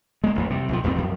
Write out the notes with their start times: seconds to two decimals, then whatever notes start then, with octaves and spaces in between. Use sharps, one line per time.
0.24 G#3 A#3
0.35 A1 F2 A#2
0.50 C3 G3
0.69 B1 E3 F3
0.84 F1 E2 G3 C4
0.96 F#2 F3